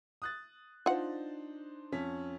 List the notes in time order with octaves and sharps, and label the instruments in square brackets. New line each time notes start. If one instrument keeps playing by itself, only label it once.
[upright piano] D#6 F#6 A6
[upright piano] D4 D#4 C5 [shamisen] F4 F#5
[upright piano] F2 C#4 B6